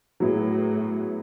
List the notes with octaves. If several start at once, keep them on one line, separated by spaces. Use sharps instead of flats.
A2 F#3 B3 E4 G#4